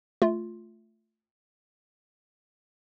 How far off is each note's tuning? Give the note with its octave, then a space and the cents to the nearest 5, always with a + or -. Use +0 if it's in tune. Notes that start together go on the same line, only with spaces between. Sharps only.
A3 +0 F4 +0